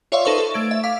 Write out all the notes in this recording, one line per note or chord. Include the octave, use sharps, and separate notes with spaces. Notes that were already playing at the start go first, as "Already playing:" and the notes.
F4 C#5 D5 E5 F5 C6
D#4 A4 B4 C5 C#6
A4
A3 G#6 D7
E5
F5 D6 B6